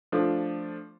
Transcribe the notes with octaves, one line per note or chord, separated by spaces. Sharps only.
F3 A3 D4